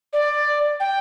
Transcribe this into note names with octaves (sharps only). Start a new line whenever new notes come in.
D5
G5